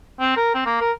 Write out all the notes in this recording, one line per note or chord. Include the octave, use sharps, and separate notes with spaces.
C4
A#4
C4
A#3
A#4